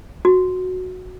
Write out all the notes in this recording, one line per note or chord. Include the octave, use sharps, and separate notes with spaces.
F#4